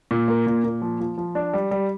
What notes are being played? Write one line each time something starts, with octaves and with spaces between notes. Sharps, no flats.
A#2
A#3
A#2
A#2
F3
F3
F3
D4
G3
G3